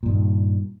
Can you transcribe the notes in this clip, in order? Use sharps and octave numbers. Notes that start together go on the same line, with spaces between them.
G2 A#2 D#3